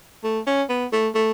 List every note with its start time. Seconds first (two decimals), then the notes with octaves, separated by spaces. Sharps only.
0.24 A3
0.47 C#4
0.70 B3
0.92 A3
1.15 A3